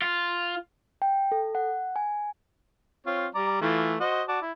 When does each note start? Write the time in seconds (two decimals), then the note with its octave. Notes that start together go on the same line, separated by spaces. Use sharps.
0.02 F4
1.02 G5
1.32 A4
1.55 F#5
1.96 G#5
3.07 C4 F4 C#5
3.35 G3 D5 A#5
3.61 E3 A3 F4
4.00 F#4 C5 D#5
4.28 F#4 D5 A5
4.42 E4